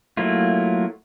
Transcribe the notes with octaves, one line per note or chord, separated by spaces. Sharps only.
F#3 A3 A#3 E4 F4